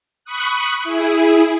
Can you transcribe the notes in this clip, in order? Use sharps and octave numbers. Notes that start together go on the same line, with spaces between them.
B5 C#6 D#6 F#6
E4 G#4